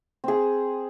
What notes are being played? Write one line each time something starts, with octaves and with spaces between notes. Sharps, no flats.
C4 G#4